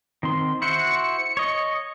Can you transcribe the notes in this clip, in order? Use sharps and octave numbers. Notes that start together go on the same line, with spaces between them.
D#3 C4 C6
E4 F#4 C5 C#7
C#5 D#5